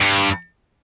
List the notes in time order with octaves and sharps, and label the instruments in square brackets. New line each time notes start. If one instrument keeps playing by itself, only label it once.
[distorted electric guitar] G2